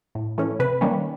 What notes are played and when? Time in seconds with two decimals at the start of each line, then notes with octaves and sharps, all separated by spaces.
0.15 A2
0.38 E3 A3 C#4
0.59 C3 B4
0.81 D#3 G3 A#3 C#4